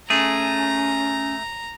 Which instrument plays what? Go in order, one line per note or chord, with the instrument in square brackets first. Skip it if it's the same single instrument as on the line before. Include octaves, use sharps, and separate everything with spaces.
[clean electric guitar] A3 G#4 [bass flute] C#4 [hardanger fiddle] A#5